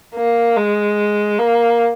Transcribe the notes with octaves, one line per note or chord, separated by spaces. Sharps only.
A#3
G#3
A#3